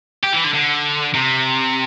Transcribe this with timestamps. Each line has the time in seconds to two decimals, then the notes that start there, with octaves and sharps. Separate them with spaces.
0.24 G4
0.33 E3
0.44 D3
0.54 D3
1.14 C3